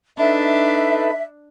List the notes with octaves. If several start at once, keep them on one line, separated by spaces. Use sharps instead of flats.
D4 D#4 A4 B4 E5